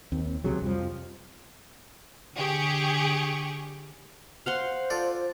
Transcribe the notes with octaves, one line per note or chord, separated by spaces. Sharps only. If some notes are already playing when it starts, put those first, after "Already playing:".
D#2 C4
C#2 C3 F#3 G#4
F2 C3 F3 G3
D3 G4 G#4 C#6
C5 F5 F#5 C6
F4 A4 D5